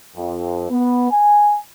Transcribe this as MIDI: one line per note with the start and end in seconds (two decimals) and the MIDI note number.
0.16 0.70 41
0.71 1.10 59
1.11 1.56 80